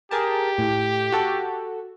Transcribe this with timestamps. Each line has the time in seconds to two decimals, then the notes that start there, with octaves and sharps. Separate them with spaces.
0.11 G4 G#4 A#4 A5
0.58 A2
1.12 F#4 A4